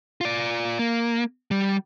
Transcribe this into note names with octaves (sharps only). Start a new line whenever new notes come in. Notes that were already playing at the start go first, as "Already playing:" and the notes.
F4 D5
A#3
G3